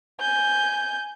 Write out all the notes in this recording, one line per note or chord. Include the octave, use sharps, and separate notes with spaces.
G#5 G6